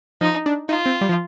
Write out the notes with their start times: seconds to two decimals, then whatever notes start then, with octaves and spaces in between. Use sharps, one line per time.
0.21 F3 D#4
0.46 D4
0.69 D#4 F4
0.86 C4
1.01 G3
1.09 F3